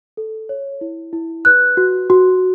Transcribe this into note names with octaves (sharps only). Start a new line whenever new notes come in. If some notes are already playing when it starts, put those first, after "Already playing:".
A4
C#5
E4
E4
B4 F#6
F#4
F#4